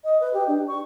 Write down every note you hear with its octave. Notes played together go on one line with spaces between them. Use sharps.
D#5
B4
G4
D4
C#6